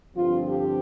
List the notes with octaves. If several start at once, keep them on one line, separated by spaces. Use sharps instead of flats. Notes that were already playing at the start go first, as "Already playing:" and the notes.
G2 D3 F3 C4 F4
G4